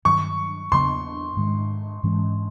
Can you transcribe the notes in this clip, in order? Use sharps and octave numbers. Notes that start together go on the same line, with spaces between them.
G2 D#3 F#3 C#6
E2 C#3 F#3 B3 C6
G#2 D#3 G#3
G#2 E3 G#3 C#4